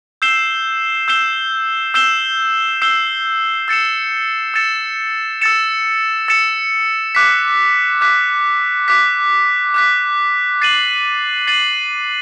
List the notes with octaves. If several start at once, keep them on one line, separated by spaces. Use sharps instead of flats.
E6 G6 C7 E7 G7
E6 G6 C7 E7 G7
E6 G6 C7 E7 G7
E6 G6 C7 E7 G7
E6 A6 C#7 E7
E6 A6 C#7 E7
E6 A6 C#7 E7
E6 A6 C#7 E7
D6 F#6 B6
D6 F#6 B6
D6 F#6 B6
D6 F#6 B6
A6 C7 D#7 F#7
A6 C7 D#7 F#7